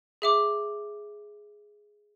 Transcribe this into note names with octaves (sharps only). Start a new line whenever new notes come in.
G#4 E5 D6